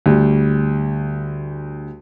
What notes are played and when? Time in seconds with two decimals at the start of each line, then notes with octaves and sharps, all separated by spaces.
0.06 D2 G3